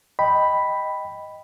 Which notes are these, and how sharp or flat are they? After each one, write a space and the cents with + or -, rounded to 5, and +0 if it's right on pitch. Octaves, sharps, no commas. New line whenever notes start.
D#5 +0 G5 +0 B5 +0